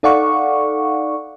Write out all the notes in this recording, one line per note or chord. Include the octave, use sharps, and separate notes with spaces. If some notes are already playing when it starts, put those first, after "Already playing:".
D#4 A4 D5 F5 F#5 C#6